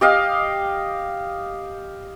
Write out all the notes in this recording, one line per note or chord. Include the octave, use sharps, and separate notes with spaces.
G4 D#5 F5